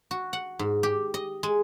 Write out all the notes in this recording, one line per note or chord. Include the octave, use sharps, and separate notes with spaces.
F#4
F#5
G#2
G4
D#5
G#3